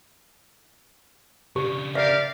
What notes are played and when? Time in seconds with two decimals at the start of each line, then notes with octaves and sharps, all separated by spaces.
1.56 C#3 D4 G4
1.95 G4 A#4 D5 E5 F5